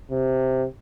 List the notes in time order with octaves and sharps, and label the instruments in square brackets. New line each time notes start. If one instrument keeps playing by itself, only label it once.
[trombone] C3